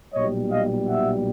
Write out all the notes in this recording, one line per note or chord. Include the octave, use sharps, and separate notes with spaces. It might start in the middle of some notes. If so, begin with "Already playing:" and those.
B1 A#2 G3 C#5 D#5
D#5 F5
E5 F#5